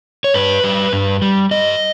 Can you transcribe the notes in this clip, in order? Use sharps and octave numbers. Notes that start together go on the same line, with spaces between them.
C#5
G2 B4
G3
G2
G3
G2 D#5